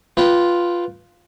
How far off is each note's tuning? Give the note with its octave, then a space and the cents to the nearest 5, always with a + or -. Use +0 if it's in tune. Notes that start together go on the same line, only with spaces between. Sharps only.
F4 +0 B4 -5 G5 -20